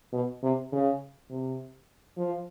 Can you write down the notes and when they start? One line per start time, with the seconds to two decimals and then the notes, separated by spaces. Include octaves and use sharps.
0.13 B2
0.43 C3
0.72 C#3
1.30 C3
2.18 F3